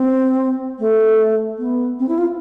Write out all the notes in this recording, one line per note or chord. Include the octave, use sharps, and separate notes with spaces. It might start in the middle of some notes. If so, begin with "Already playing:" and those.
Already playing: C4
A3
B3
C4
E4
F4